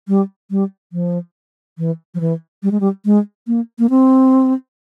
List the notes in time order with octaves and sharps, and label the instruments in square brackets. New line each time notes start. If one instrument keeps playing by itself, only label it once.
[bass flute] G3
G3
F3
E3
F3
E3
G3
G#3
G3
G#3
A#3
A#3
C4